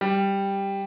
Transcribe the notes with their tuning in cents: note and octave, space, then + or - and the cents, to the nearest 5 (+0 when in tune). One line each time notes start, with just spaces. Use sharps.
G3 +5